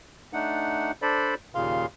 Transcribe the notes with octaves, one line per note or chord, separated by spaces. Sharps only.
A3 D4 D#4 F#5
D4 A4 C5 D5 B5
D#2 A#2 C#3 F5 C6